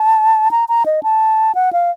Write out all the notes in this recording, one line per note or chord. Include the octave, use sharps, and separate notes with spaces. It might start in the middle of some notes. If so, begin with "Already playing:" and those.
Already playing: A5
A#5
A#5
D#5
A5
F#5
F5